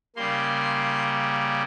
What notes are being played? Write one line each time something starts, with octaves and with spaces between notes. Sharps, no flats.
C#3 G3 A#3 C6
C6